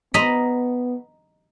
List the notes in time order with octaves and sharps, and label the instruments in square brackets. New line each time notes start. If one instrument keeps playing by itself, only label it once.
[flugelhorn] B3 [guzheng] D#5 A#5 B5